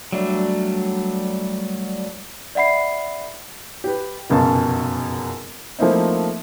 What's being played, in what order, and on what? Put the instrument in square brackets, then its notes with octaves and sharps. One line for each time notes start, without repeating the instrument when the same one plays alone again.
[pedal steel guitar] F#3 G3 A3 D4
[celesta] D5 E5 F#5 B5 C7
[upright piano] G4 B4
F1 C#2 F#2 B2 F5 A5
F3 A3 A#3 C4 D#4 E4